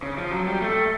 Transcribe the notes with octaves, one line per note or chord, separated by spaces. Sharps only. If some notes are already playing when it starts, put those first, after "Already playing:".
C#3
F3
F#3
G3
A3